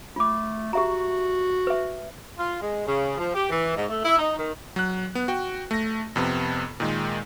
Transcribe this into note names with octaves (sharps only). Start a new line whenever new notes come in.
A3 F4 D6
F#4 G4 E5 A#5
B4 E5
F4
G#3
C#3
F3
G4
E3
G#2
A3
E4
D#4
D#3
F#3 F#6
B3
F#4 G5
A3 A#6
F2 C3 B3
A#2 D#3 G#3